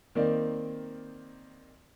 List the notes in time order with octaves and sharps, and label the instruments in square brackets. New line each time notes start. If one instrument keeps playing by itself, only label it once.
[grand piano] D#3 A#3 C4 D5